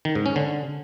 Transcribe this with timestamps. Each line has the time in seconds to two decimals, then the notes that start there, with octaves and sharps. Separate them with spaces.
0.05 D#3
0.15 G#2
0.26 C#4
0.36 D3